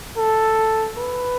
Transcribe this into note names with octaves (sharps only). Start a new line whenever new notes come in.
A4
B4